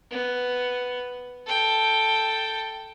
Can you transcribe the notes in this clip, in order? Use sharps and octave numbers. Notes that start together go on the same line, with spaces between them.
B3
A4 G5